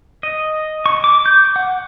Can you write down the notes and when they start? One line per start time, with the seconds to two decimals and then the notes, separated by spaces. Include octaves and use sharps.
0.23 D#5
0.86 C#6
1.04 D6
1.26 G6
1.56 F#5